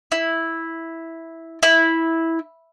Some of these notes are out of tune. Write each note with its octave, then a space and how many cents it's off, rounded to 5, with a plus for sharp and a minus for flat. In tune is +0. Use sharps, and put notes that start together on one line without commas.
E4 -5
E4 -10